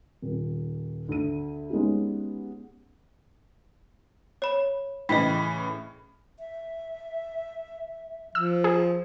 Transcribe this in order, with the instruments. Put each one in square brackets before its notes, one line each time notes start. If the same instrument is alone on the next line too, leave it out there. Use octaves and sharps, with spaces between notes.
[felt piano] D#1
D2 D#7
G#3 B3 C#4 D#4 G4 G#4
[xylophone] C#5 B5
[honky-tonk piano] A2 C#3 E3 [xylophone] D#5 G5 [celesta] B5 B6
[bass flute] E5
[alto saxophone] F3 [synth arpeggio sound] E6
[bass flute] F4 [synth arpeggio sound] G#4